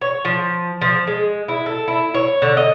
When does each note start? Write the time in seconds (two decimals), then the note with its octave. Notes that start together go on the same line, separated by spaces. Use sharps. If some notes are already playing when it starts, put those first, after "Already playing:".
0.01 C#5
0.25 F3
0.81 F3
1.07 G#3
1.48 E4
1.66 A4
1.88 E4
2.14 C#5
2.42 D3
2.57 D#5